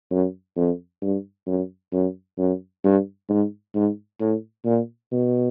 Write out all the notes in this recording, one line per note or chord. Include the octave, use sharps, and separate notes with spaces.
F#2
F2
G2
F#2
F#2
F#2
G2
G#2
G#2
A2
A#2
B2